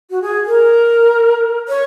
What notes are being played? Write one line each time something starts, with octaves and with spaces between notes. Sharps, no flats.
F#4
G#4
A#4
C#5